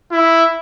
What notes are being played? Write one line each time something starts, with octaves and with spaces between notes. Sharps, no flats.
E4